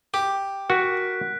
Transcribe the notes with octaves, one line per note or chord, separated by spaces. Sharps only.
G4
F#4 A#4 F#6 B6 D7